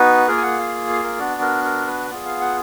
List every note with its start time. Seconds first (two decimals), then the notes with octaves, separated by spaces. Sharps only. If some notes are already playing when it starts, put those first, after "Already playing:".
Already playing: B3 D#4 F#4 B4
0.28 A#3 F4 G#4 A#4
0.38 G#5
0.42 F#5
0.59 F5
0.89 F5
1.03 A#4
1.19 B3 D4 F#4 D5
1.41 A#4
1.64 A#4
1.87 B4
2.10 B3 F4 G#4 D5
2.26 F5
2.41 F#5